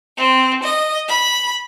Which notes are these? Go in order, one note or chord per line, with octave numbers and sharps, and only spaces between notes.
C4
D#5
B5